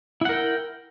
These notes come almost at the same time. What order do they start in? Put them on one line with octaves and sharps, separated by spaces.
E4 F#5 A#4 G5